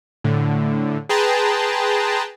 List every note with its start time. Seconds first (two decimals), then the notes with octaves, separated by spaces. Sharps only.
0.24 A2 D3
1.09 G#4 B4 G5 A5 A#5 C6